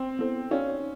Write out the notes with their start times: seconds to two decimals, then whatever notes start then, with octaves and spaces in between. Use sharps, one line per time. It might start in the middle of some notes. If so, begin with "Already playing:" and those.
Already playing: C4
0.19 B3 E4 A4 C5
0.51 C#4 D#4 F#4 A4 D5 F5